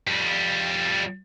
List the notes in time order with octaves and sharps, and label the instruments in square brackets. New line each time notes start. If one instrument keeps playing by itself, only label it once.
[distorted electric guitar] F2 G3